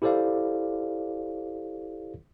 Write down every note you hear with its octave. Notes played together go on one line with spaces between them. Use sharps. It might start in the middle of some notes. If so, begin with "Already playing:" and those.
E4 G4 A4 C5 D5 F5